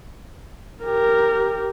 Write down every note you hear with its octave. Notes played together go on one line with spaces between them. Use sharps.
G4 A#4